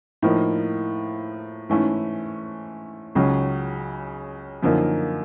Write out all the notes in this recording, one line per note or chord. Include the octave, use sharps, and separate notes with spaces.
A2 F3 A#3 D#4
G#2 E3 A3 C#4 E4
C#2 C#3 F#3
F#2 D3 F3 A#3 D#4